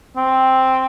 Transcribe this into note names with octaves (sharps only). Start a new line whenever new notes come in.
C4